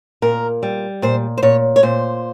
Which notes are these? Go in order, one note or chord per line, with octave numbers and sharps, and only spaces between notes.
A#2 A#4
G3
A#2 C5
C5
A#2 C#5
C#5
A#2 C5